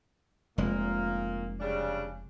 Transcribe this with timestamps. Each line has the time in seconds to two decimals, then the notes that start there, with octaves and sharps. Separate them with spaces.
0.58 F1 A#2 G#3 A#3
1.60 C#3 G3 D4